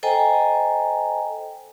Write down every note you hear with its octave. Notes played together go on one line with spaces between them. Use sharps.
A4 C5 D#5 G5 G#5 A#5